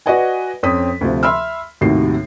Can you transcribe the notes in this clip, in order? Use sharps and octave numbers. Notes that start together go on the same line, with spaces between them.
F#4 B4 D5 D#5 F#5 G#5
F2 C4 C#4 D#6 B6
D2 C3 F3
E5 B5 C6 E6 F6
D#2 A2 C3 D#3 F#4 C7